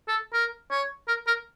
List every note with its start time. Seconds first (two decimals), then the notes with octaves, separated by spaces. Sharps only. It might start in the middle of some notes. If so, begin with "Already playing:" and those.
0.08 A4
0.33 A#4
0.71 C#5
1.08 A#4
1.27 A#4